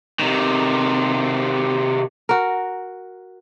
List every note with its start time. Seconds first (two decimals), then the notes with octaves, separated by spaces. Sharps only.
0.19 C3 D#3
2.29 F#4 A#4